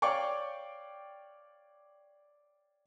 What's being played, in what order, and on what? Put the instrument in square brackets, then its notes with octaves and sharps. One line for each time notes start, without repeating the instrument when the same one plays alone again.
[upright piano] C#5 D5 F5 G5 C#6 D6